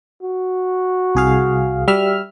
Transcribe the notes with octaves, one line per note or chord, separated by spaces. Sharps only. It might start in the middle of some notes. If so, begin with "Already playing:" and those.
F#4
C2 G#4 F5
G3 E5 F6